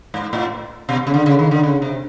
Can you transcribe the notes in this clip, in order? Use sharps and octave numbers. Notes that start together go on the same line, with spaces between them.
G#2
A2
B2
C#3
D3
C#3
D#3
D3
C#3
C3